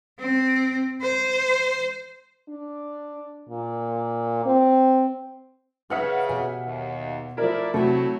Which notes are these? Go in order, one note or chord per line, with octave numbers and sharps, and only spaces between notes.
C4
C5
D4
A#2
C4
C#3 B4 C#5 E5 F#5 F6
B2 G4 G#5
D#2
F3 A3 E4 A#4 D5
C3 F#3 A3 E4 F#4